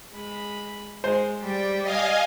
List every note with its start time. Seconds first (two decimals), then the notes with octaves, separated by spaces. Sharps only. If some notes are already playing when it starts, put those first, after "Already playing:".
0.12 G#3 B5
1.04 G#3 C5
1.42 G3 D5 G5
1.83 D#5 F5 G#5